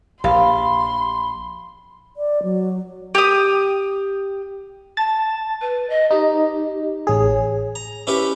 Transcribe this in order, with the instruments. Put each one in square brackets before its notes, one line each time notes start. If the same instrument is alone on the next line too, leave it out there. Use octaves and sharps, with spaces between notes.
[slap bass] A#1 [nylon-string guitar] G4 F5 [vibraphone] B5 [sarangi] C6
[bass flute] D5
F#3
[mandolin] G4 D#6
[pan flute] A5 [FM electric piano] A6
[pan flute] B4
D#5
[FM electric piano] D#4 [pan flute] G4
[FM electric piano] A1 G#4 [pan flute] C#5
[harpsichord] A#5
C#4 E4 G4 B4 C#5